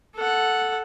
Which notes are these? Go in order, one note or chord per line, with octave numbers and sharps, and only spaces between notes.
A4 F#5